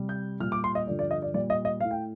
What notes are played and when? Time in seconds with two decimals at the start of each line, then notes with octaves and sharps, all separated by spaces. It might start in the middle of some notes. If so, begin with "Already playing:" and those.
Already playing: C3 G3
0.09 G6
0.40 A#2 G3 F6
0.52 D6
0.64 C6
0.75 D#5
0.87 G2 D3 F3 D5
0.99 D5
1.11 D#5
1.22 D5
1.34 A#2 G3 D5
1.50 D#5
1.65 D#5
1.81 A2 A3 F5
1.91 G5